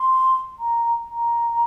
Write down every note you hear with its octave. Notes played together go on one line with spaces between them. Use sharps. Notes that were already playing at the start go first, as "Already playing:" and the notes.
Already playing: C6
A#5
A#5